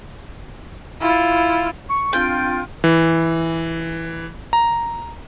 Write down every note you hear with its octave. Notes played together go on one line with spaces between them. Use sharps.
E4 F4
C#6
C4 D4 F4 G5
E3
A#5